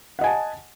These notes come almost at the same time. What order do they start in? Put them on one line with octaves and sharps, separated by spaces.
F#5 D#5 G#5 A5